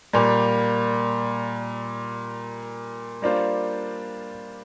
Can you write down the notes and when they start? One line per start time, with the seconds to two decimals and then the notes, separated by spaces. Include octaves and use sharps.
0.13 A#2 G3 A#3
3.22 G3 A#3 D4 F4 C5